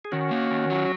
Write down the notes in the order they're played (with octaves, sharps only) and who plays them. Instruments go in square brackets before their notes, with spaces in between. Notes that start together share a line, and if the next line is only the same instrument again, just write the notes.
[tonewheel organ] G#4
[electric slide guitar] D#3 [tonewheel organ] C#4 F#4
[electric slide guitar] A#3
D#3
F#3